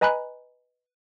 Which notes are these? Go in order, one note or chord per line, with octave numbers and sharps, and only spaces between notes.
B4 D#5 G#5 A#5 B5 F#6